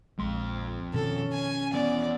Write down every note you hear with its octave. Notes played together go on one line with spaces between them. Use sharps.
A#1 F2 G#3 C6
B2 D#3 F3 C#4 A4
G#5
E2 B3 D5